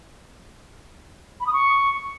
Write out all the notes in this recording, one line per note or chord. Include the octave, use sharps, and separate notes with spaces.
B5
D#6
C#6